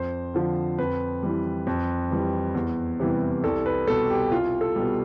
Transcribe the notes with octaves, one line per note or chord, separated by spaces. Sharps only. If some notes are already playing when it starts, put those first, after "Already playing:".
Already playing: F2 C5
D3 F3
F2 B4
E3 G3
F2
E3 G3
E2
C3 E3 G3
C2 A4
B4
B2 G3 A4
G4
C2 F4
A4
B2 G3